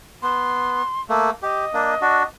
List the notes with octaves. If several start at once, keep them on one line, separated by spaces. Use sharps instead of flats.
B3 C6
A3 A#3
G4 D#5
A#3 D4
D4 F#4